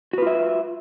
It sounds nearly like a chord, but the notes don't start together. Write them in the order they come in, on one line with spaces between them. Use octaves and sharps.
F#4 B4 F4 E5